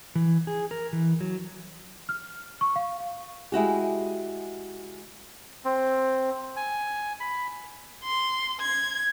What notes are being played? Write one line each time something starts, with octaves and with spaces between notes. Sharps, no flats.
E3
G#4
A#4
E3
F#3
F6
C#6
F5
G#3 E4 F#4 G4
C4
G#5
B5
C6
G#6